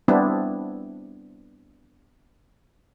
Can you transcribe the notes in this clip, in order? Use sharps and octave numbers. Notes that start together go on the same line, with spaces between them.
G3 B3 C4 D4 E4